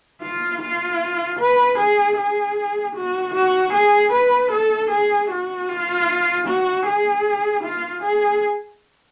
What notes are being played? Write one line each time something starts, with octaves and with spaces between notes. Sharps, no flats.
F4
F4
B4
G#4
G#4
F#4
F#4
G#4
B4
A4
G#4
F#4
F4
F#4
G#4
F4
G#4